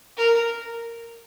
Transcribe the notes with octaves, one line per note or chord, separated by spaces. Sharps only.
A#4